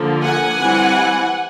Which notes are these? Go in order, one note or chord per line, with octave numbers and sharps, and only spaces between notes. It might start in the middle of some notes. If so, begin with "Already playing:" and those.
Already playing: D3 F3 A#3
F#5 G#5
E3 G3 C4